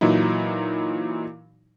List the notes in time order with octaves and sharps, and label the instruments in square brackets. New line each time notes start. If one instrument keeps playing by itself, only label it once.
[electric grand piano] A#2 E3 F#3 D#4 E4